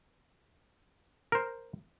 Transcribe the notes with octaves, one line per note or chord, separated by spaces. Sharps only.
A#4 C5